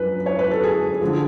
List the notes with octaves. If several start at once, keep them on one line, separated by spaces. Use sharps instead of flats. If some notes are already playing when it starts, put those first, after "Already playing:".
Already playing: F#2 F3 B4
C#5
B4
A4
G#4
D3 F3 G#4